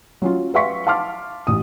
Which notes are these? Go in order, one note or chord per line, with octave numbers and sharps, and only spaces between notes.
F#3 C#4 F4
B4 E5 F5 C6 C#6 B6
F5 A5 C6 D6 F6
A1 D#6